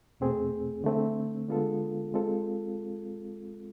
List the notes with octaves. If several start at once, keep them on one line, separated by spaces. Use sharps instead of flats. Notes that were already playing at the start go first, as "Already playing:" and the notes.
E2 B2 A3 C4 G#4
D3 A3 C4
D3 G#3 B3 F4 A4
G#3 C4 F4 A4